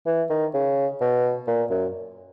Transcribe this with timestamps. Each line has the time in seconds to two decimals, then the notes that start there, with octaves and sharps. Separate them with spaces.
0.06 E3
0.30 D#3
0.54 C#3
1.01 B2
1.47 A#2
1.70 F#2